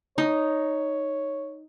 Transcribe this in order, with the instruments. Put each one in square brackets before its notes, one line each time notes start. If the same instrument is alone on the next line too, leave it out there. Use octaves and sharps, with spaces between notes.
[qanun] D#4 [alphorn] C#5